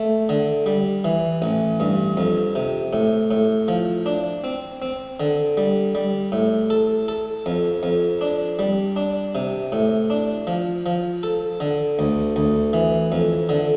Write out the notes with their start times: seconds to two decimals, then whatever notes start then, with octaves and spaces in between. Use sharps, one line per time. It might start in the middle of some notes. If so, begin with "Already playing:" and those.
Already playing: A3
0.29 D3
0.66 G3
1.04 E3
1.42 A1
1.80 G2
2.17 F2
2.55 C3
2.93 A2
3.31 A2
3.68 F3
4.06 D4
4.44 C4
4.82 C4
5.20 D3
5.57 G3
5.95 G3
6.32 A2
6.70 A4
7.08 A4
7.46 F2
7.83 F2
8.21 D4
8.59 G3
8.96 D4
9.35 C3
9.72 A2
10.10 D4
10.47 F3
10.86 F3
11.23 A4
11.60 D3
11.99 D2
12.36 D2
12.73 E3
13.12 F2
13.49 D3